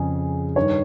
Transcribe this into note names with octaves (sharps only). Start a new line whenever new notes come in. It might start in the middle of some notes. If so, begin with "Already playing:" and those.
Already playing: F2 C#3 G#4
G2 D#3 C#5